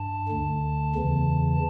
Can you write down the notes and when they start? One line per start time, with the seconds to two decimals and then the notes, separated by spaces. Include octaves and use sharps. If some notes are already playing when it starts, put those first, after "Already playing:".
Already playing: G2 A5
0.29 D2 D3
0.95 E2 C#3 E3